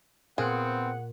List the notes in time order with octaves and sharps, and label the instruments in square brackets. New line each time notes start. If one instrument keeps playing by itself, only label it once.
[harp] A#2 F#6 C#7 [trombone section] B3 C4 [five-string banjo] G#4 [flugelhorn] F#5